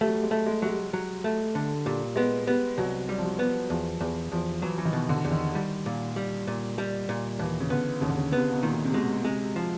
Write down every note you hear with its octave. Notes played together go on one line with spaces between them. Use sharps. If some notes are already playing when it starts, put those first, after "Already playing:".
G3 A3
F#3
G3
G#3
A3
G#3
F#3 G#3
G3
F#3
A3
D3
A#2 G3
G#3 B3
G3 B3
C2 F#3
G3
F3
F#3
B3
E2 F3
E2 E3
E2 F3
E3 F#3
E3
D#3
B2
D3
E2
D#3
G3
A#2
G3
A#2
G3
A#2
D#2 E3
C#3
D3 B3
D#2 C#3
D3
C#3
C3 B3
B2
A#2 D#3
C3
B2 G#3
C3 G#3
F3